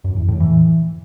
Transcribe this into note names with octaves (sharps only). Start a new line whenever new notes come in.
F#2
E2
A2
E3